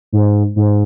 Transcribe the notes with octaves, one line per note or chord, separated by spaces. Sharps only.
G#2
G#2